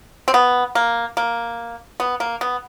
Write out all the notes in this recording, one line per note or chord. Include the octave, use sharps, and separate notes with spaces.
C4
B3
A#3
A#3
B3
A#3
B3